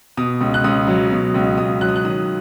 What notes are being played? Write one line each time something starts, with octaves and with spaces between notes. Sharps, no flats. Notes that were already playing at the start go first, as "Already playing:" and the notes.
B2 D#6
C#2
F#6
C#2 D#6
F#3
B2
C#2
C#2 D#6
F#3 F#6
D#6
F#6
D#3 D#6